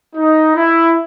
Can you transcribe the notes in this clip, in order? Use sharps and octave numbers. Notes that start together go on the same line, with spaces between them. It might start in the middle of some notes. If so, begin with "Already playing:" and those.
D#4
E4